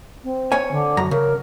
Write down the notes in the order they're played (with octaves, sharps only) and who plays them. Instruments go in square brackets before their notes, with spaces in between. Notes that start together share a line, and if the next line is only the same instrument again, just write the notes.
[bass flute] C4
[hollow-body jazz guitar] C#5 G#5
[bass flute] D3
[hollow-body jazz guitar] F#2 A#5
[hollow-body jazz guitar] C#3 [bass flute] A#4